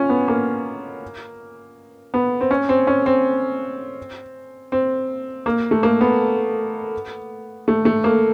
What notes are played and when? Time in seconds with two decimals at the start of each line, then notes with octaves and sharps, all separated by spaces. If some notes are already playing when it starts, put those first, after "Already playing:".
Already playing: C#4 F4
0.09 B3
0.28 A#3
2.14 B3
2.41 C4
2.51 C#4
2.69 C4
2.87 C#4
3.06 C4
4.72 C4
5.46 A#3
5.71 A3
5.83 A#3
6.01 B3
7.68 A3
7.85 A3
8.04 A#3